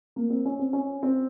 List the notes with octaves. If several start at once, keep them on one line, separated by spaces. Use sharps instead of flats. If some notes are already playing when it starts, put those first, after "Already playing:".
A#3
C4
C#4
C4
C#4
C4